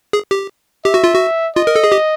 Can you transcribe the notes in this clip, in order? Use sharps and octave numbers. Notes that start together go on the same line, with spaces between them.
G#4
G4
G4 E5
F#4
F4
F#4
F4 D#5
A#4
A4
G#4
G4